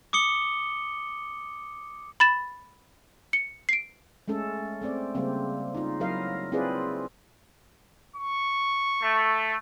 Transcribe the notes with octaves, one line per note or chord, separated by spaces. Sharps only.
D6 D#6 C#7 G7
B5 A6 E7
C#7
C7 D7
G#3 A3 C#4 A4
A3 C4 D5
C#3 G3 A#3 C4
D#4 F4
F#3 E4 A#4 D#5 F5
C4 E4 F4 G#4 B4 D5
C#6
A3